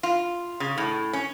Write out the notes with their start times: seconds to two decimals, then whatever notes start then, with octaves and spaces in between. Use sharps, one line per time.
0.03 F4
0.60 C#3
0.78 A2
1.13 C#4